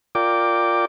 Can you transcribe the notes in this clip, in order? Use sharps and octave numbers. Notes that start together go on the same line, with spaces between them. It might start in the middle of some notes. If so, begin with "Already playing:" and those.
F4 A#4 D5 G5 D6